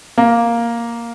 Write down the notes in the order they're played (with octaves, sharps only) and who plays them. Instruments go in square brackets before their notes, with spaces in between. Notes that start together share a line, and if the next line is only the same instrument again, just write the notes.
[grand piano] A#3